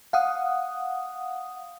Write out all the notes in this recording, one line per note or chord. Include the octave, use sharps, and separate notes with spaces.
F5 F#5 D#6